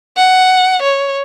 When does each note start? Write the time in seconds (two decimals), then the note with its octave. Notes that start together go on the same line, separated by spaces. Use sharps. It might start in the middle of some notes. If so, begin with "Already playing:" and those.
0.17 F#5
0.83 C#5